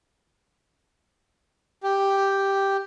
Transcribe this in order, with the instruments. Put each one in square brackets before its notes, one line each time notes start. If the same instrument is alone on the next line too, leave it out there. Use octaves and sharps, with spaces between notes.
[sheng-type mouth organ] G4